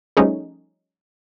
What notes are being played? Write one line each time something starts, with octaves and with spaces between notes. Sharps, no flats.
F3 G3 A3 C#4 D#4 G#4